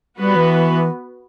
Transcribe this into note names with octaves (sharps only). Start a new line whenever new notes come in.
G3 B3 F#4 B4
E3